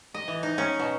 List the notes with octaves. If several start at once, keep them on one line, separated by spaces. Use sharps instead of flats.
D#5
E3
D#4
C#4
B2